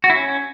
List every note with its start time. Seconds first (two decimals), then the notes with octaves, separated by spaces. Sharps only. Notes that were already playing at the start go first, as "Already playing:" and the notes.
0.04 F#4
0.10 E4
0.15 C#4